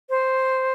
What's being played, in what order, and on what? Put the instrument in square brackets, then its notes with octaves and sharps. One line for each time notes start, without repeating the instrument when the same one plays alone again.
[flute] C5